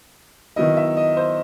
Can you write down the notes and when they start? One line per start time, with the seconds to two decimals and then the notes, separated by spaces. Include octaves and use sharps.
0.56 D#3 F#3 B3 E4 D#5
0.77 E5
0.97 D#5
1.17 C5